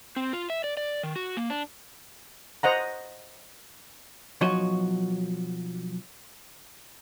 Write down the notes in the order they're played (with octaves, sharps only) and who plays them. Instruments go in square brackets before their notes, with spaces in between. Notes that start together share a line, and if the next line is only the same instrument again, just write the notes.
[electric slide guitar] C4
F4
E5
D5
D5
D#3
F#4
A#3
D4
[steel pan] C5 D#5 F#5 A#5
[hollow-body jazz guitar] B1 F3 F#3 F#4 C#5 D#5